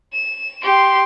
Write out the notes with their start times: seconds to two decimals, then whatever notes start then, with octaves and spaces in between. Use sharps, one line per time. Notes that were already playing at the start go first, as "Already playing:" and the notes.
0.13 E7
0.63 G4 C6